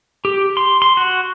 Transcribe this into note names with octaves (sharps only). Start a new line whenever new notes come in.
G4
C6
C6
F#4